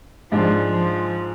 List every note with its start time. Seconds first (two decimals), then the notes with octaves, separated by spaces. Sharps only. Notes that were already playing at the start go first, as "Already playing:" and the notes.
0.32 G#2 F3 G#3 D4
0.72 F3